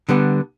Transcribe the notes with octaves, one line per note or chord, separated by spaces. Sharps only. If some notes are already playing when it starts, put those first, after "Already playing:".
D3 G3 B3